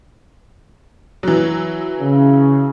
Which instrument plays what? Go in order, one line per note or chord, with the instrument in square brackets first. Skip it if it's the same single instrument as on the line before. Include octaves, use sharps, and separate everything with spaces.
[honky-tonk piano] E3 F#3
[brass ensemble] C#3